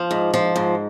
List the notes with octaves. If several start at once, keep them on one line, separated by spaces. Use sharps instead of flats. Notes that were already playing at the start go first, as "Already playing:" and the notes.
Already playing: F3
G#2
F3
G#2